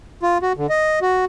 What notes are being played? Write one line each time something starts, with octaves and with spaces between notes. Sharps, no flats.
F4
F#4
D3
D#5
F#4